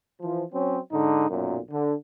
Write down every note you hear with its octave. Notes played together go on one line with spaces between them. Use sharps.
E3 F3
F#3 C4 C#4
G#2 D3 D#4
B1 F#2 A#2
D3